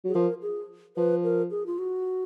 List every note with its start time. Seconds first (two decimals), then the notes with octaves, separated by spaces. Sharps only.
0.04 F#3 G#4
0.15 F3 A#4
0.42 G#4
0.97 F3 B4
1.24 A#4
1.51 G#4
1.66 F4
1.79 F#4